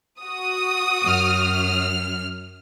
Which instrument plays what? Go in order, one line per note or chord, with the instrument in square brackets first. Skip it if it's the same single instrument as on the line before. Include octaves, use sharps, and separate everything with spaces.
[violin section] F#4 D#6
[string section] F#2 F6